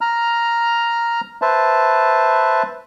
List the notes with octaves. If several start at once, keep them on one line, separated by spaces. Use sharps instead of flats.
A#5 F6
B4 C5 E5 A5